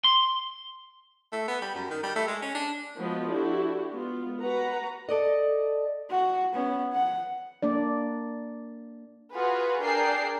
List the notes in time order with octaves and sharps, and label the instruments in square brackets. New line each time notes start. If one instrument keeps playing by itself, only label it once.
[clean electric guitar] C6
[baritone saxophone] A3
B3
G3
F#2
D#3
G3
A3
G#3
C#4
D4
[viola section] F3 G#3 B3 F#4 B4 D#5
D4 E4 F#4 G4 A4
G#3 B3 F4
F#4 B4 F#5 A#5
[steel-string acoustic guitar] A4 D5 D#5
[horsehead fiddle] F#4
B3 C#4
F#5
[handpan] A#3 D4 D5
[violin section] F4 F#4 G#4 B4
D4 G#4 A#4 G5 C7